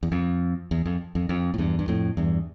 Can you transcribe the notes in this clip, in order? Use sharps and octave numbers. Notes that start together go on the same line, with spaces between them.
E2
F2
E2
F2
F2
F2
A2
E2 G2
G2
F2 A2
E2 G2